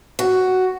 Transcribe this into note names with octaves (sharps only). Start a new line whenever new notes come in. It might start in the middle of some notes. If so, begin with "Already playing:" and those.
F#4